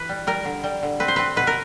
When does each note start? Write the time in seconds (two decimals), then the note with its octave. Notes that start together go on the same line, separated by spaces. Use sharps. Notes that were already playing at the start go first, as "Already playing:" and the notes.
Already playing: E3 B4
0.09 G3
0.27 G3 A#4
0.45 D3
0.64 G3
0.83 D3
1.00 C4 B4
1.08 C5
1.16 C4 B4
1.36 B2 B4
1.47 A#4